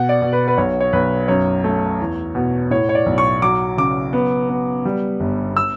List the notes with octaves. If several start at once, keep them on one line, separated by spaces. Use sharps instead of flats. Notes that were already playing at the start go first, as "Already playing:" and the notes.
Already playing: B2 F#5
D5
B2
B4
B4
B1 C#5
C#5
B1 B4
F#2 C#5
A3
E2
B2
A2 C#5
C#5
D5
B1
C#6
F#3 D6
C#3 D6
B3
B3
G3
G1
E6